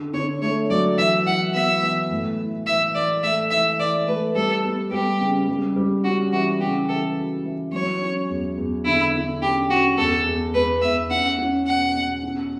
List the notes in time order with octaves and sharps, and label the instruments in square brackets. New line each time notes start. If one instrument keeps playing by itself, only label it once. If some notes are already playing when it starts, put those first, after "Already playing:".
Already playing: [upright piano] D3
[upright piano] D3 [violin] C#5
[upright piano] A3 [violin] C#5
[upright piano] F#3 [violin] D5
[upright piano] E3 [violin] E5
[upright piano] E3 [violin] F#5
[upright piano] B3 [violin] E5
[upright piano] E3
A2
E4
[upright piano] E3 [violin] E5
[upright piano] E3 [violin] D5
[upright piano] A3 [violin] E5
[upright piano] E3 [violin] E5
[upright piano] E3 [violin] D5
[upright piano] A3 [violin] B4
[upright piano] G3 [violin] A4
[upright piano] B3
[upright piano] G3 [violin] G4
[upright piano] C#3
G3
G3
[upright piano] C#4 [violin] F#4
[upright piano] E3 [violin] F#4
[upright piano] C#3 [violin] G4
[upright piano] E3 [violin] A4
[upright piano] F#4
E3
[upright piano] F#3 [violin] C#5
[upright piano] C#4
E2
E2
[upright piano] D3 [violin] E4
[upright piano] D3
[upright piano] C#4 [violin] G4
[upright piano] C#4 [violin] F#4
[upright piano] E2 [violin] A4
[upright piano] E2
[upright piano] E2 [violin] B4
[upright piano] E2 [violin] E5
[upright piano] C#4 [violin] F#5
[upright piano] C#4
[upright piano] B2 [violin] F#5
[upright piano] B2
C#4